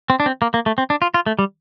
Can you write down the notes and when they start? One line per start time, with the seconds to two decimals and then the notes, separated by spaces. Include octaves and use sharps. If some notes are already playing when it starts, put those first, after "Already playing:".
0.10 C4
0.20 D4
0.26 C4
0.42 A#3
0.54 A#3
0.66 A3
0.78 C4
0.90 D4
1.02 F4
1.14 F4
1.26 A3
1.39 G3